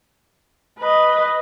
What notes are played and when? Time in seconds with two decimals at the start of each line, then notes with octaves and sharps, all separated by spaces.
0.79 B4 D#5